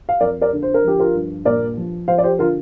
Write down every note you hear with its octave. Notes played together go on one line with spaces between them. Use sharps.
F5
F2 A#4 D5
A#4 D5
D3
C5
A#4
F3 G4
F4 A#4
G2
A#2 A#4 D5
F3
F3 C5 F5
D5
G4 C5
D3 F4 A#4